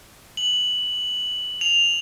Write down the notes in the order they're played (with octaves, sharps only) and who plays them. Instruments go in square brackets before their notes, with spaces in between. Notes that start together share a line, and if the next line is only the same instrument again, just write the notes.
[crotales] F#7
F7